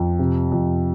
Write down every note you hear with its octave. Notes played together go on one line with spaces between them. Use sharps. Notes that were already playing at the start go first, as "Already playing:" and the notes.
Already playing: F2
C3
F2